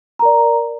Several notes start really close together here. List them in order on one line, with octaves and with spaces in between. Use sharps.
A#5 A#4 D5